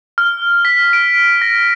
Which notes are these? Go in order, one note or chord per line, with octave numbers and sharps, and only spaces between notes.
F6
B6
D7
A#6